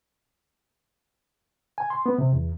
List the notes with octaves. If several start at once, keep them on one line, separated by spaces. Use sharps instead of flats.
G#5
C6
B3
C3
E2